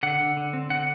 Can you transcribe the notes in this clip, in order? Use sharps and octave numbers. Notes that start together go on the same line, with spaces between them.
D3 F#5
D3
D3
C4
D3 F#5